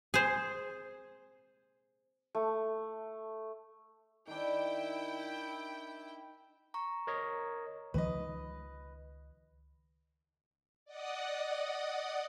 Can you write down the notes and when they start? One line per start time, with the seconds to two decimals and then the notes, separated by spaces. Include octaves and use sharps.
0.14 G#4 C5
2.35 A3
4.27 D#3 D4 E4 G5
6.74 A#5 C#6
7.07 A#4 C#5 D#5
7.94 C#2 D#3 F3 B4 D#5
10.85 D5 D#5 F#5 D#6